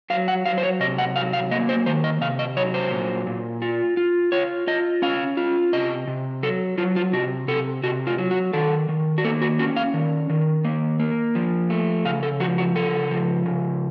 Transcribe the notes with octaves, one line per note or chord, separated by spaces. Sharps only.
F#3 F5
F#5
F#3 F5
C5
C#5
C3 D#5
F#5
F#3 F5
F5
A#3 D#5
C5
D#3 C5
D#5
C3 F5
D#5
F#3 C#5
C5
A#2
A#2
F4
F4
F4 C#5
F4 D#5
C#4 F5
F4
C3 D#5
C3
F#3 A4
F#3 F4
F4
C3 F#4
C3 A4
C3 F#4
F4
F#3
F#4
D#3 A4
D#3
F#4
A#3 A4
F#4
C#4 F#4
F5
D#3
D#3
A#3
A#3
F3
A3
C#3 F5
A4
F3 F#4
F#4
C#3 A4
F3
C#3